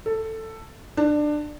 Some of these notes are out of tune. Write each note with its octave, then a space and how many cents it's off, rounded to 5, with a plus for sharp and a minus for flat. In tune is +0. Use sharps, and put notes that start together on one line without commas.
A4 +10
D4 +20